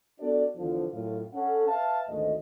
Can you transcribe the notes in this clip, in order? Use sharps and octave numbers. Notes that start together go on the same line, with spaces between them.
B3 D4 F#4 A4 D5
E2 D3 F3
F#2 A2 F4
C#4 A4 F#5
B4 E5 F5 A5
G#1 D2 G#3 A3 D#5